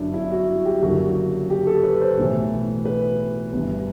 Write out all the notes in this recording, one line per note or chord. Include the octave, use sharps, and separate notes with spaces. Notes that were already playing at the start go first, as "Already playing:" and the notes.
Already playing: G1 F#2 D3 D4 E4
E4
F#4
G4
F#1 F#2 D3 F#4
G4
A4
B4
C5
B1 A2 E3
B4
G1 G2 E3